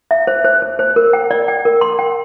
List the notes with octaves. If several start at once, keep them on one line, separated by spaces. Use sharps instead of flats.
E5
C5
C5
C5
C5
A#4
G5
D5
G5
A#4
C6
G5